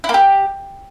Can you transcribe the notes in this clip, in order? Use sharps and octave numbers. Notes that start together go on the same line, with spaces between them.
E4
A#3
G4